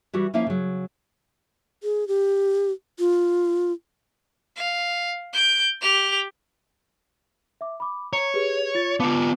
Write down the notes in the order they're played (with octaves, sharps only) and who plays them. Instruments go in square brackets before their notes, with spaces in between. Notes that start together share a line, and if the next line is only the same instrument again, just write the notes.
[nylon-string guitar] E3 G3 F#4
F3 A#3 C#4 E4 E5 F5
C#3 F#3
[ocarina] G#4
G4
F4
[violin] F5
G6 D7
G4 F7
[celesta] E5 D6
B5 D6
[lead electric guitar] C#5 [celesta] A#5
[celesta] G4 G#4 B4
F4 A6
[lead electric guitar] B3 F4 [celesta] F5 A5 D6